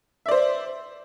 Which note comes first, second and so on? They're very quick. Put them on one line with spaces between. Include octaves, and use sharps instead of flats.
E5 D5 C5